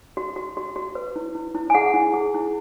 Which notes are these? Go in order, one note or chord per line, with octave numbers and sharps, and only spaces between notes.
F#4
F#4
F#4
F#4
B4
E4
E4
E4
G#5
G#4 F#5
E4
G#4
E4